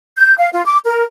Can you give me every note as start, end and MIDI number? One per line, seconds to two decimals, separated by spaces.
0.17 0.35 91
0.38 0.49 77
0.52 0.65 65
0.66 0.79 86
0.86 1.04 70